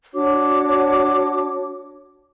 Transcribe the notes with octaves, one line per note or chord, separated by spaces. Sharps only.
D4 F#4 C#5 D6